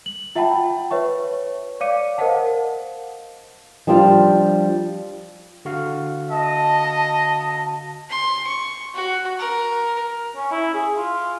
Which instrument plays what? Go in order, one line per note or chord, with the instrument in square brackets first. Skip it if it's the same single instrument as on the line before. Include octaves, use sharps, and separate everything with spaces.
[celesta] F#7
F4 E5 F#5 G5 A5 B5
B4 C#5 E5 C#6
C#5 D5 F5 D6 C#7 D#7
A#4 C5 D#5 F5 F#5 A5
[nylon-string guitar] F3 G3 C4 D4 F4 G4
[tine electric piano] D3 F#4 F5
[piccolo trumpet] D#5 [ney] A5
[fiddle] C6
C#6
F#4
A#4
[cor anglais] C#4
E4
G#4
F4